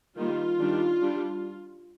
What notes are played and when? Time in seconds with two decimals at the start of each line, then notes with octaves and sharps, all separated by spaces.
0.17 D#3 G3 A#3 F4
0.59 D#3 G3 D4
1.02 G3 D4